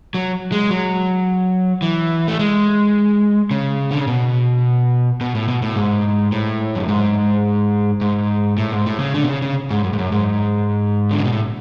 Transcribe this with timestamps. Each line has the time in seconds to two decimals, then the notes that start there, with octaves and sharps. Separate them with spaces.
0.15 F#3
0.52 G#3
0.71 F#3
1.82 E3
2.28 A3
2.39 G#3
3.51 C#3
3.91 D3
3.99 C#3
4.07 B2
5.21 B2
5.35 A2
5.48 B2
5.62 A2
5.76 G#2
6.32 A2
6.75 F#2
6.89 G#2
8.01 G#2
8.58 A2
8.72 G#2
8.86 A2
8.99 C#3
9.14 D3
9.23 B2
9.28 C#3
9.42 C#3
9.70 G#2
9.84 F#2
9.93 G#2
9.99 F#2
10.12 G#2
11.11 D3
11.18 C#3
11.24 B2
11.32 A2